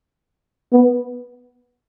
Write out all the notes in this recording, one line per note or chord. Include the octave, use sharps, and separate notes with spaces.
B3